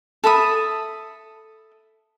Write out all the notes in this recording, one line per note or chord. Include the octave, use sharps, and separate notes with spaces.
A4 E5 B5 D#6